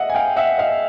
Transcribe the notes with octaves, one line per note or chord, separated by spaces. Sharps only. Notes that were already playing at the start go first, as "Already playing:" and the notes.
Already playing: D#5 E5 F#5
G#5
F5 G5
E5 F#5
D#5 F5